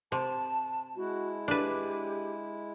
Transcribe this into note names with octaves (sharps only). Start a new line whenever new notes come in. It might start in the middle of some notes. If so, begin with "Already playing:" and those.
C3 A5
G#3 E4 F#4
D4 G4 B4